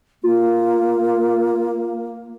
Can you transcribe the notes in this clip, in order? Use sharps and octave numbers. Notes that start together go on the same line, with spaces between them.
A#3 F4